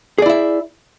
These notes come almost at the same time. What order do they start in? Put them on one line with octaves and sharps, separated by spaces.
G#4 D5 E4 E5